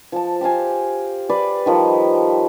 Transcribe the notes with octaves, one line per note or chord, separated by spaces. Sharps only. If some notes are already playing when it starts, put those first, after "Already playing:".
F3 A5
G4 C5 F5 G#5
B4 D5 C6
D#3 F3 G3